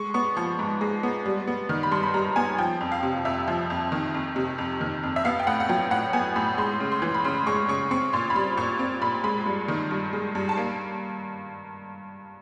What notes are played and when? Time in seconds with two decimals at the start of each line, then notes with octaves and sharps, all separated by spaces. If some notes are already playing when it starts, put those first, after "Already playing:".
Already playing: G#3 C#6
0.14 B3 C#6
0.37 F3 C#6
0.59 G#2
0.81 G#3
1.03 B3
1.26 G3
1.47 B3
1.69 D#3
1.83 B5
1.92 G2 C6
2.03 B5
2.14 G3 A#5
2.36 B3 G#5
2.58 F3 G5
2.81 F2
2.92 F5
3.03 C3
3.25 F2 E5
3.48 F3
3.70 F2
3.92 D#3
4.14 F2
4.36 C3
4.58 F2
4.81 D#3
5.03 F2
5.16 E5
5.25 B3 F5
5.39 G5
5.47 A2 F#5
5.60 F#5
5.69 F#3 G5
5.91 A2 F#5
6.13 B3 G#5
6.36 A2 B5
6.58 G#3 C6
6.80 C#3
6.92 C6
7.02 E3
7.14 B5
7.24 C#3 C6
7.47 G#3 C#6
7.68 C#3 C#6
7.91 C4 C#6
8.13 A#2 C6
8.30 B5
8.35 G3 C6
8.57 A#2 C#6
8.79 C4
9.02 A#2 B5
9.24 G#3 B5
9.46 G2
9.68 D#3
9.91 G2
10.13 G#3
10.35 G2
10.49 A5
10.57 A#3